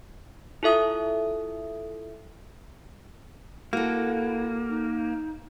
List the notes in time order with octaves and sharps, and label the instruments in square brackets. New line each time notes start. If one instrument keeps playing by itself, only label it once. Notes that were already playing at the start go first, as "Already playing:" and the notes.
[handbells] E4 F4 A4 E5 D#6
[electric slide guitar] A#3 [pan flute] E4 [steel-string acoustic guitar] F#4 A4
[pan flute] D#4